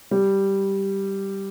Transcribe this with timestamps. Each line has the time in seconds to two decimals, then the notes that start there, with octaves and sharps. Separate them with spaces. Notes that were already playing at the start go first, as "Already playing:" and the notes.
0.11 G3